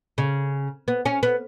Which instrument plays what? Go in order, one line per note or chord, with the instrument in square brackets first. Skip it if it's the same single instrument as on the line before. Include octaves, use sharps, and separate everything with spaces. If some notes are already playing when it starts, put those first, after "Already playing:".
[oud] C#3
B3
C#4
B3